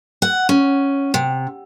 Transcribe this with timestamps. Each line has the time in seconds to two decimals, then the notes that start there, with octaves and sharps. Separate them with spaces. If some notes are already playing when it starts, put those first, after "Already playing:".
0.22 F#5
0.49 C#4
1.14 C3